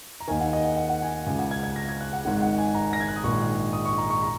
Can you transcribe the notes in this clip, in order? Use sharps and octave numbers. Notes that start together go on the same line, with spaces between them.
A#5
D#2 D#3 G#5
F#5
D#5
F#5
F#5
F#5
G#5
C#2 C#3 G#5
F#5
G#6
G#6
A#6
G#6
F#6
F#5
G#1 G#2 D#3 F#5
F#5
G#5
A#5
A#6
G#6
F#6
D#6
A#1 G#2 D#3 C#6
D#6
C#6
A#5
C#6
A#5